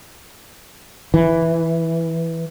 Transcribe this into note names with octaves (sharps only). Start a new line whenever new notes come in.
E3